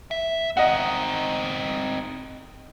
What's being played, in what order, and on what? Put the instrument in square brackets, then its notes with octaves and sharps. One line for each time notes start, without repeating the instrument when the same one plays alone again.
[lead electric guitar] E5
[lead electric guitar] C4 D#4 [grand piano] D#5 F#5